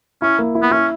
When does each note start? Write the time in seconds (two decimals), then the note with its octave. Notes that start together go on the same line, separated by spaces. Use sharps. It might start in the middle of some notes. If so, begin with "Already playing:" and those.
0.22 C#4 E4
0.39 A#3
0.55 E4
0.62 B3
0.71 C#4 E4